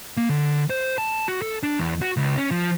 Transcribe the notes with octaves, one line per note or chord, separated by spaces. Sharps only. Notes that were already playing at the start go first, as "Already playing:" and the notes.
A#3
D3
C5
A5
F#4
A4
D4
E2
F#4
C#2
C#4
F3